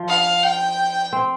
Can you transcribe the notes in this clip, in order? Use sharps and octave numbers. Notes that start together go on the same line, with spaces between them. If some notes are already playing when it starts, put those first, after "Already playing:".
Already playing: F3
F5
G5
C4